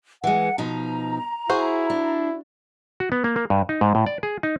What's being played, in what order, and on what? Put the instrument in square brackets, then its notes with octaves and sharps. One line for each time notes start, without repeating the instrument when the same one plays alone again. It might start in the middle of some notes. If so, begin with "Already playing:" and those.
[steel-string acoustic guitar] E3 G#3 [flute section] F#5
[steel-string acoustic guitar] B2 F3 D#4 [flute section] A#5
[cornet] E4 [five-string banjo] F#4 C5 [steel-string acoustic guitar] G#4
[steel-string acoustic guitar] D4
[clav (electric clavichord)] F#4
B3
A#3
A#3
G2
D#4
G#2
A2
D5
G#4
D#4